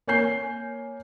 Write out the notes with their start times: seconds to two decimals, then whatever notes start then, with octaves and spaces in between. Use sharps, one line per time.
0.07 A#3 C#5 G#5 G6 C7